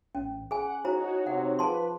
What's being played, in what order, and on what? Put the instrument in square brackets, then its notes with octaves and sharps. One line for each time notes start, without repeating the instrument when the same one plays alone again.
[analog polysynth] A1 [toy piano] C#4
[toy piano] G#4 G#5 [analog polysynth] F#5
[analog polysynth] D#4 F#4 C#5 [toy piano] E4 C5 A#5
[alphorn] C3 [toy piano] F#5
[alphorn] F3 [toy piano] G#4 A5 C6 [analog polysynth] B4